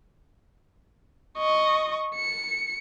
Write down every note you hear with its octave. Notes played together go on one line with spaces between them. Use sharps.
D#5 C#6
C#7